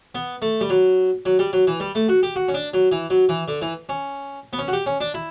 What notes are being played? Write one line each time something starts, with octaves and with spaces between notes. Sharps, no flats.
B3
A3
G3
F#3
F#3
G3
F#3
E3
G3
A3
F#4
G4
F#4
C#4
D4
F#3
E3
F#3
E3
D3
E3
C#4
B3
C#4
F#4
G4
C#4
D4
E4